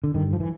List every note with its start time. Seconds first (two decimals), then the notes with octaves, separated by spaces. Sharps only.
0.04 D3
0.14 G2 D3 D#3
0.33 F3
0.40 E3